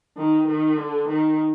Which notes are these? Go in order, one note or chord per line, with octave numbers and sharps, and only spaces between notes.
D#3
D#3
D3
D#3